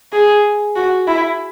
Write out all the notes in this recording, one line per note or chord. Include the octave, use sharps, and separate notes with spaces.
G#4
F#4
E4